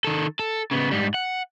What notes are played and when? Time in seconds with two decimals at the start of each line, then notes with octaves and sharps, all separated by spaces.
0.05 D#3 A4
0.39 A4
0.71 C#3 B3
0.91 G#2 G3
1.14 F#5